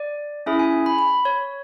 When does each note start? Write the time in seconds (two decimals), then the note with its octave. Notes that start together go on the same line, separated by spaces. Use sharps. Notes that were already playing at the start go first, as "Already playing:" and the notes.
Already playing: D5
0.46 C#4 E4 G#4 E5
0.59 G#5
0.86 B5
0.99 B5
1.25 C#5